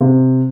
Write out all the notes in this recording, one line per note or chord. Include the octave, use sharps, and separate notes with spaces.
C3